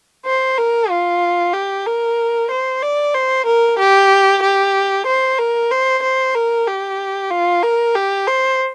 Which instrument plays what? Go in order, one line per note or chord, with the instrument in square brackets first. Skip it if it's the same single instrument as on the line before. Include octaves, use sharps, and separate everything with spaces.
[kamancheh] C5
A#4
F4
G4
A#4
C5
D5
C5
A#4
G4
G4
C5
A#4
C5
C5
A#4
G4
F4
A#4
G4
C5